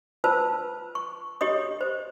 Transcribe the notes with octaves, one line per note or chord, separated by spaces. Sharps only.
F4 B4 C5 A5 E6
C#6
G4 C#5 D#5 D#6
C5